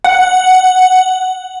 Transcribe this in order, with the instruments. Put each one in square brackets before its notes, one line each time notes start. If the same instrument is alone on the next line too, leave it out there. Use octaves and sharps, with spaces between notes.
[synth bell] F#5